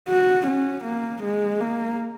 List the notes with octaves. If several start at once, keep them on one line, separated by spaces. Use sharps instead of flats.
F#4
C#4
A#3
G#3
A#3